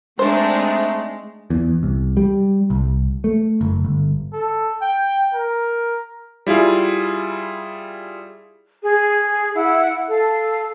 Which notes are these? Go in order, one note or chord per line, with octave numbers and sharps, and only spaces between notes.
G#3 A3 C4 D4 D#4 C5
E2
C2
G3
C2
A3
F#1
G1
A4
G5
A#4
G3 E4 F4 G#4
G#4
E4 F#5
A4 F5